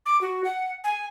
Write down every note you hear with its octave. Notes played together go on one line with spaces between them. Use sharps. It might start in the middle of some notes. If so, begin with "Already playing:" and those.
D6
F#4
F#5
G#5